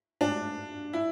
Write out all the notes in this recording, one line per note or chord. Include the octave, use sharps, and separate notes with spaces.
D4
E4